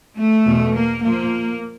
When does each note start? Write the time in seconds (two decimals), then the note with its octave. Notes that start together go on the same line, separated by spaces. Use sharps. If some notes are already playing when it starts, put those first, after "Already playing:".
0.17 A3
0.46 E2 B2
0.75 A#3
1.03 A#2 F3 A#3